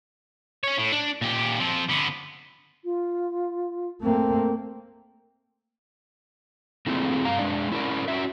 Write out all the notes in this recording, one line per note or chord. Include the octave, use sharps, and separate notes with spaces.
C#4 C#5
A2
D4
A#2 G4
F3 C4
D3 B3
F4
A3 A#3 C4
A3 A#3 C4 E4 F4 G#4
G2 F5 A#5
G#3 D4 D5
C#4 E4 A#4 C#5 D5
C#4 F#4 E5